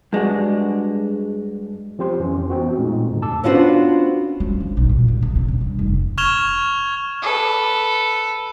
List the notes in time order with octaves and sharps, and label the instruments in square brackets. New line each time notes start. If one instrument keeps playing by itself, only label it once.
[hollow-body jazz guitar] G2 G#3 D4 F#4
[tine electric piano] F3 C4 G4 C5 C6
F2 E3 C4 C#4
B3 C4 F#4
A#2 G#3 A3 D#4
E2 G#2 D3
A5 D6 E6
[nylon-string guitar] B3 C#4 D4 F4 F#4 C5
[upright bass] G#3
D3
B1
A#2
F#1
D3
C3
C#3
G2
F1
[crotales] C#6 F6 G#6 E7 F7 G7
[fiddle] A4 B4